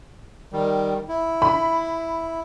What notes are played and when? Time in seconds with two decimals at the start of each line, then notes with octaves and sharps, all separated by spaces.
0.52 D#3 G3
1.08 E4
1.42 B5